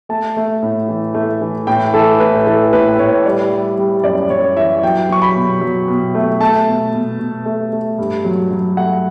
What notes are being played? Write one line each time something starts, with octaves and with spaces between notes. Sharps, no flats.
A3 A5
A3
A2
E3
A3
E3
A2 G5
E3 A4
A2 B4
E3 A4
A2 B4
A2 C#5
G3 D5
G3
G3
F#2 D5
F#2 C#5
E3 E5
F#3 G5
F#3 C#6
B5
B2
F#3
B2
A3
A3 A5
B2
B2
B2
A3
A3
G2
F#3
F#3
A3 F#5